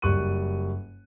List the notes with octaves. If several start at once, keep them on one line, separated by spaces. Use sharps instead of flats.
F#1 G3 C#6 F#6 D#7